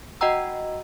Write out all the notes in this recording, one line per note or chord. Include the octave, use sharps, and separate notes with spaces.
F#4 D#5 F#5 G5 A#5 E6